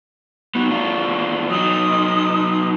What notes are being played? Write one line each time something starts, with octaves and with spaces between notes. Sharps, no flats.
B3 D#4 F#4 C#6
E2 D4 F4
F#3 D#4 D#6